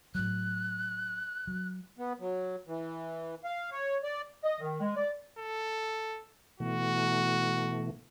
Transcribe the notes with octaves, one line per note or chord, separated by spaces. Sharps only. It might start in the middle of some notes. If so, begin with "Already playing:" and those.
A2 F#3 F#6
F#3
B3
F#3
E3
F5
C#5
D5
D#5
D#3
G#3
D5
A4
B2 E3 A3 F#4